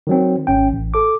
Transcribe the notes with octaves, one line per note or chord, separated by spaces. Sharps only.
D#3 F#3 C4
G#1 C#4 G5
A1
A4 D6